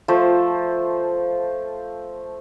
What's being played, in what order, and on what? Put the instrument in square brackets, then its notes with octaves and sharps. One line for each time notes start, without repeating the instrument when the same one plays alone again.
[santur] F3 A3 C5